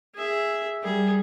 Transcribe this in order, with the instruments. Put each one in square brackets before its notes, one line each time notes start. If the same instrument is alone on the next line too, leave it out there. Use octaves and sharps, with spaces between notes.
[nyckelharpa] G#4 E5
[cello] G3 [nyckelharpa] G#4